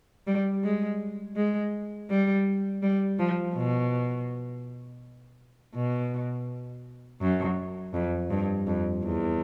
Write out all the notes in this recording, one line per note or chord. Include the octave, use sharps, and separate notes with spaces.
G3
G#3
G#3
G3
G3
F3
B2
B2
F#2
F2
G2
F2
E2